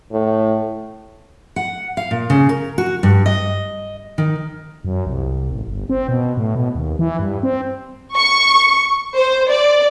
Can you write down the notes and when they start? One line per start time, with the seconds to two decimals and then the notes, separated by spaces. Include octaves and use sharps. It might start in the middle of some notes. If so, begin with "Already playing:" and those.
0.12 A2
1.56 F#5
1.97 F5
2.11 A#2
2.30 C#3
2.49 A#4
2.78 F#4
3.03 G2
3.26 D#5
4.18 D#3
4.85 F#2
5.07 C2
5.52 A1
5.67 G1
5.90 C4
6.08 B2
6.37 A2
6.56 B2
6.75 D#2
6.99 E3
7.19 G2
7.43 C4
8.16 C#6
9.17 C5
9.50 D5